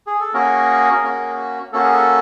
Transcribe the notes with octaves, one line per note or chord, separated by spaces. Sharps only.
G#4
A4
A#3 C#4 F#4 G#4 A#4
A#3 C#4 F#4
A#3 C#4 F#4 A4
G#4
A4